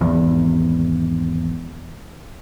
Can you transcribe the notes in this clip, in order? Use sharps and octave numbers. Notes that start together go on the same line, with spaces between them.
G#1 E2